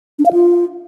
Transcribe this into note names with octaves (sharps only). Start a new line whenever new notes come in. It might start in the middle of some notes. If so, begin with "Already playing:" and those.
D4
F5
F4